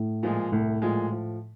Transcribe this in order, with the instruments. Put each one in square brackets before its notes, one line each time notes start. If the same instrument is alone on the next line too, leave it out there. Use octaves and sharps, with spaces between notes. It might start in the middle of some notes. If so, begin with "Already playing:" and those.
Already playing: [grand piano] A2
[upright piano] A#2 F3 G#3
[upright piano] C2 [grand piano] A2
[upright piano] A#2 F3 G#3
F3